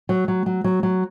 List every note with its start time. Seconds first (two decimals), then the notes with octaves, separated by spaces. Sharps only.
0.09 F#3
0.28 F#3
0.46 F#3
0.64 F#3
0.83 F#3